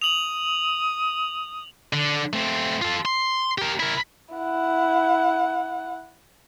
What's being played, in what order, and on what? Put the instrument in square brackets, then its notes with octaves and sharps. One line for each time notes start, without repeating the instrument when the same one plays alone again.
[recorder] D#6 [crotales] F7 F#7
[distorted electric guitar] D3
A3 C4
F4 A4
C6
G4 A#4
E4 A#4
[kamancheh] E4 F#5